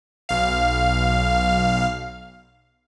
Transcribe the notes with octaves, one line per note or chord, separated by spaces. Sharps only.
B1 F5